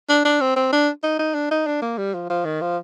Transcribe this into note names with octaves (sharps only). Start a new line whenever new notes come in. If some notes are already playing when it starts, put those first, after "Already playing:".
D4
D4
C4
C4
D4
D#4
D#4
D4
D#4
D4
A#3
G3
F3
F3
D#3
F3